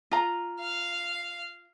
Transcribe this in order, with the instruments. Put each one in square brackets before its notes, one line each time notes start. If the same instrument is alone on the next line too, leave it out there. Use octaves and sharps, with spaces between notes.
[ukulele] F4 A#5
[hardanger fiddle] F5